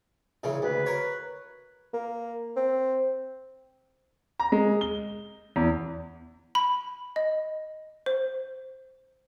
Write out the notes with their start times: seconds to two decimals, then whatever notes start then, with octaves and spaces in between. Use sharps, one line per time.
0.43 A#2 C#3 E3
0.62 D2 B4
0.86 A#4 C#5
1.93 A#3
2.56 C4
4.39 A#5
4.52 G#3
4.81 G7
5.56 E2
6.55 B5
7.16 D#5
8.06 C5